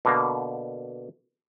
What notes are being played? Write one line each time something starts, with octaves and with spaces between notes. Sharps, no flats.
B2 D3 A#3